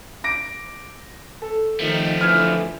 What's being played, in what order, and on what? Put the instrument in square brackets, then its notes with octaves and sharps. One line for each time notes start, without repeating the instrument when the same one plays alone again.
[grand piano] D6 A#6 D7
A4
[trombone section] D#3 [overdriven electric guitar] F3 A3
[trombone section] D3 E3 [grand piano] F6 G#6